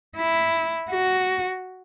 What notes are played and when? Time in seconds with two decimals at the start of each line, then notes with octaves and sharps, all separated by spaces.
0.17 E4
0.91 F#4